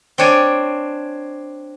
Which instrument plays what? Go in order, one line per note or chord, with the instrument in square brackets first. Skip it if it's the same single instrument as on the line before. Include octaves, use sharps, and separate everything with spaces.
[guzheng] C4 D4 C#5 D5 G#5